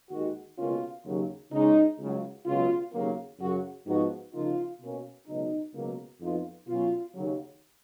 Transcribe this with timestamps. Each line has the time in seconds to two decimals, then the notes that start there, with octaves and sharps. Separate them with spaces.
0.11 D#2 D#3 G#3 F#4
0.57 C#2 B2 A#3 C#4 F4
1.04 D#2 C#3 F#3
1.51 C#3 G#3 C#4 D#4
1.99 C#2 C#3 F#3
2.45 C#2 B2 F#3 C#4 F4
2.93 D#2 C#3 F#3 A#3
3.39 F#2 C#3 F#3 F#4
3.86 G#2 F3 B3 D#4 F#4
4.33 C#3 F3 A#3 D#4 F4
4.81 B2 A#3 C#4
5.27 C#2 B2 F#3 D#4
5.74 C#2 B2 F#3 A#3
6.20 F2 F3 B3 D#4 F4
6.67 B2 F#3 C#4 F4
7.14 D#2 C#3 F#3